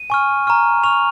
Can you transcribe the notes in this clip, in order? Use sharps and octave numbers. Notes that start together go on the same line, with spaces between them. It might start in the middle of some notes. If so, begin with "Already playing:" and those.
Already playing: D#7
G#5 C#6 F6
A#5 C#6 F6
A#5 C#6 F6 F7